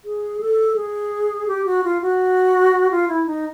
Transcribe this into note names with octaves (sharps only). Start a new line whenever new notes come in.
G#4
A4
G#4
G4
F#4
F4
F#4
F4
E4
D#4